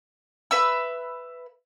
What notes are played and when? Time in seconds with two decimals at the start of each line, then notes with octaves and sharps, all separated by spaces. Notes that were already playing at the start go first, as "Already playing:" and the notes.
0.51 B4 E5 E6